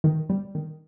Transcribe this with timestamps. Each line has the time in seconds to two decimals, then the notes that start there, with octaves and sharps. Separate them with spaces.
0.04 D#3
0.30 G3
0.55 D#3